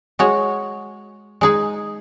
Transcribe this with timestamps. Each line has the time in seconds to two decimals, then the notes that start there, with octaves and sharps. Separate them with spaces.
0.19 G#3 F#4 C#5
1.41 G#3 D#4 G#4